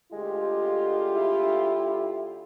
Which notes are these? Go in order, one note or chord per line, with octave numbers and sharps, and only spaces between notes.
D2 G#3 F4 G4
E4